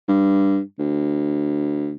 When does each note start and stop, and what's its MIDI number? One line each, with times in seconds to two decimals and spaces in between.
0.08 0.60 43
0.79 1.95 38